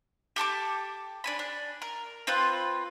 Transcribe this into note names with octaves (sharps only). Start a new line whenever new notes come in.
G4 A4 A5 D6
D4 G#5 B5
D4
A#4
C4 F4 B4